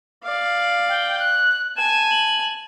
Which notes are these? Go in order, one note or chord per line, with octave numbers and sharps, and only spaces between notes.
D5 F5
G5
F#6
G#5 A5 E7
F#7